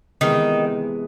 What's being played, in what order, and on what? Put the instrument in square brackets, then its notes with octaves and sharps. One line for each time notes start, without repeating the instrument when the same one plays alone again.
[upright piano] C3 E3 G#3 B3 D#4 [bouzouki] D#3